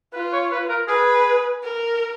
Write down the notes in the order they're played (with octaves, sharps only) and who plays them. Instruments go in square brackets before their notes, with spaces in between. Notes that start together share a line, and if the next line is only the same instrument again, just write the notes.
[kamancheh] F4 [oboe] B4
[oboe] C#5
B4
A#4
[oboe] G#4 [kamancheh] B4
[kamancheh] A#4